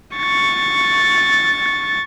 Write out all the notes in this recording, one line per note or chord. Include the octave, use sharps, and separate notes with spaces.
C#6 A6